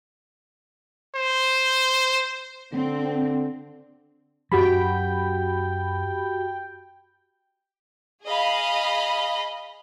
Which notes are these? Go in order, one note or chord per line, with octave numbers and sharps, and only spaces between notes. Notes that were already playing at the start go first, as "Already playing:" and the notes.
C5
D3 C4
F#2 F#3 F#4 G4 G5 B5
G#4 D#5 F5 B5